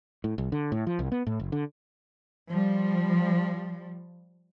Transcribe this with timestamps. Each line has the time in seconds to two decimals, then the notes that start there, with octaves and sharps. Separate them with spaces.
0.24 A2
0.38 C2
0.52 D3
0.72 A2
0.87 F3
0.99 C2
1.12 B3
1.27 A2
1.40 F#1
1.52 D3
2.49 F3 G3